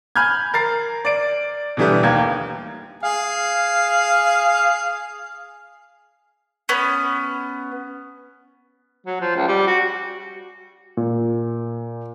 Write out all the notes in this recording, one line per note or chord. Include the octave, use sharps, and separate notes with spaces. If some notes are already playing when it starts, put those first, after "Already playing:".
G#5 B5 F6 G6 G#6
A#4 A6 C7
D5 D7
B2 D3 E3 G3 A3 B3
D#2 A#3 G#6
G#4 F5
B3 C#4
F#3
F3
C#2
G3
F#4
A#2